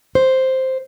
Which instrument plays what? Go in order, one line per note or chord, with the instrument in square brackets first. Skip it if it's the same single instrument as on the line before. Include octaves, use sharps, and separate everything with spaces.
[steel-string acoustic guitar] C5